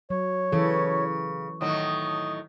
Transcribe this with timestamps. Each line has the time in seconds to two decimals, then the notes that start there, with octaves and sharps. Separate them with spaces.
0.10 F#3 C#5
0.52 C#3 E3 A4
1.61 A2 D#3 F#3 D#6